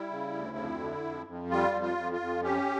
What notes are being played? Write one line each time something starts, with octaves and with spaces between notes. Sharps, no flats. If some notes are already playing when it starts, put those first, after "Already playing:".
Already playing: G3 E4
C#3
D2
F2
D3
F2
F2
G3 F4
F2
F4
F2
F4
F2
C#4 G4